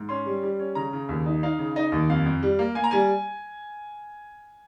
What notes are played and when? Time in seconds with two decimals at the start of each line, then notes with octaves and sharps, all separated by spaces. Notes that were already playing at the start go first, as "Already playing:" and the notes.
Already playing: G#2
0.09 C#4 C6
0.26 G3
0.43 G3
0.59 C#4
0.75 C#3 A#5
0.93 C#3
1.09 D#2
1.26 D#4
1.43 D#4 F5
1.59 C#3
1.76 D#4 D#5
1.92 D#2
2.09 F2 F5
2.25 F2
2.43 G3
2.59 A#3
2.75 A#3 G#5
2.84 A#5
2.91 G3 G#5